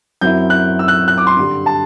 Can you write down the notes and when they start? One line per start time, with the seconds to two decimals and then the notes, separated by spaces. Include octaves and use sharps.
0.21 F#2 F#3 C4 E4 G6
0.50 F#6
0.79 E6
0.88 F#6
1.08 F#6
1.18 D6
1.27 C6
1.37 G2 D3 G3
1.66 A5